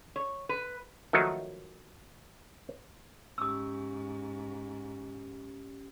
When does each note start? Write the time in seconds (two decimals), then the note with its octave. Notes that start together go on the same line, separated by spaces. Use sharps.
0.16 C#5
0.49 B4
1.13 D#3 F3 F#3 A3 A#3 D#4
3.38 G#2 C#4 G4 D#6 E6